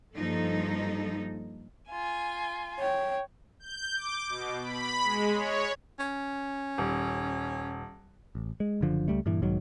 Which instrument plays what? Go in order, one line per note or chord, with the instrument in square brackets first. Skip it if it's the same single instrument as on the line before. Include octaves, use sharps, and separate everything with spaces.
[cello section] G2 F3 A#3 D#4 A4
[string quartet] F4 G#5
[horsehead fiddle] C#5 G5
[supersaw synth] G6
D6
B2
B5
G#3
C#5
[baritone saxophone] C#4
[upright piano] D#1
[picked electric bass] A1
G#3
F#1 F#2 D3 F3
C#2 G3 A3
G2 A#2 E3
B1 G#2 D#3 F#3